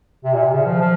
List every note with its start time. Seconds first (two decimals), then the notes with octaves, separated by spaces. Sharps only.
0.24 C3
0.34 A#2
0.43 C3
0.52 C#3
0.66 F3
0.81 F3